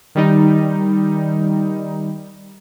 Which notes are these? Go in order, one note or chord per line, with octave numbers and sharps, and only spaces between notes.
D#3 G3 D#4